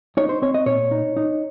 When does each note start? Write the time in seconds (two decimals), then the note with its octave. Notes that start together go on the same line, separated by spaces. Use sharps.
0.17 D#4 C#5
0.29 C5
0.42 C4 C#5
0.54 D#5
0.66 A#2 C#5
0.91 D#4
1.17 D#4